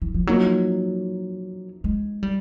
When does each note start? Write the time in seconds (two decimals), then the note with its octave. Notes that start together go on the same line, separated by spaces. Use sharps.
0.02 E3
0.14 F3
0.27 F3 F#3 A#3 D#4
1.84 G#3
2.23 G3